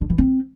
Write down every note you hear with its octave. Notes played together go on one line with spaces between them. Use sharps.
D3
E3
C4